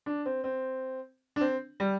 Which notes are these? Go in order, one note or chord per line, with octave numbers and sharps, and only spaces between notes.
D4
C4
C4
D4
C4
G3